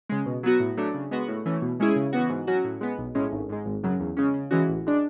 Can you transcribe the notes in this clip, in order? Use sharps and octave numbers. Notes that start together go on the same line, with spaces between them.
C#3 G#3
B2
F#3 B3 F#4
A2
F#3 A3 D4
C#3
G#3 B3 F#4
A2
E3 A3 C#4
B2
G#3 C#4 E4 G#4
C#3
E3 B3 F#4
G#2
F#3 C#4 F#4
A2
G#3 B3
B1
A2 G#3 C#4
G#1
G#2 G#3
G#1
F#2 C#3 F#3
E2
C#3 G#3 C#4
C#3
E3 G#3 C#4 F#4
A1
G#3 D4